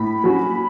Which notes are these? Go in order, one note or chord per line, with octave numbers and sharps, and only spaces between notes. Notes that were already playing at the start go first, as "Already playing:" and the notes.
Already playing: A2 B5
F#3 C#4 F#4